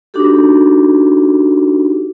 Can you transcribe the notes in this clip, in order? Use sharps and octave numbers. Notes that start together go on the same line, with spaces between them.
D4 D#4 F#4 G4 A4